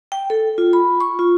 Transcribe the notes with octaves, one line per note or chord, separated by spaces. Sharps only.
G5
A4
F4
B5
C#6
F4